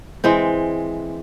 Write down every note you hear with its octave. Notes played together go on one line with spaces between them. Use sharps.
E3 G#3 C4